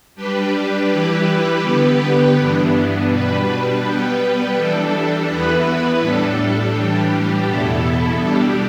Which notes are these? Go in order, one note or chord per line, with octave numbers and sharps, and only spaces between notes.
G3 D4 G4 B4
E3 G3 E4 G4 B4
D3 B3 G4 B4
G2 E3 B3 D4
B2 G3 D4 B4
G3 B3 G4 B4
E3 G3 D4 A4
E2 E3 B3 E4 B4
A2 G3 D4 A4
A2 E3 G3 D4 G4
E2 B2 B3 E4 A4
B2 G3 D4 G4